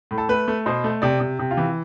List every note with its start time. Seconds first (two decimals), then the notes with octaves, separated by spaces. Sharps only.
0.11 A2
0.18 A4
0.29 A3 B4
0.48 A3
0.66 B2 C5
0.84 A3
1.02 C3 D5
1.20 C3
1.39 C3
1.51 F4
1.57 E3